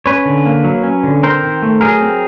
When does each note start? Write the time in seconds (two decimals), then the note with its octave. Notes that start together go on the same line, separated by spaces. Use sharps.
0.06 C#4 B4 C#5
0.25 D3
0.46 A#3
0.64 F#3
0.83 C#4
1.03 D3
1.23 C4 A#4 C5
1.43 D#3
1.62 A3
1.81 F#3 G#4 A#4
2.01 C4